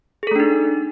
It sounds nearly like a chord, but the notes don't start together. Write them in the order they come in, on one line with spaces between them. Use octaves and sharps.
G#4 A4 A3 D4 D#4